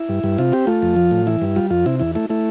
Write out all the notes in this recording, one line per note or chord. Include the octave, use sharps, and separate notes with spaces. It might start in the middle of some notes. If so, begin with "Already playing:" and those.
Already playing: E4
G2
G2
C3 F4
C4 G4
A3 F4
F2
F3
A2
E3 E4
G2
G3 F4
F2 F4
C3 E4
E2 E4
A3 E4
A3 E4